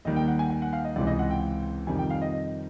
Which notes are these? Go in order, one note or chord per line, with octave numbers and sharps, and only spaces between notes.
D#2 D#3 G3 D#5
G5
F#5
G#5
G#5
F#5
F5
D#5
C#2 C3 E3 D5
D#5
F#5
G5
F2 C3 D#3 G3 G#5
G5
F5
D#5
D#5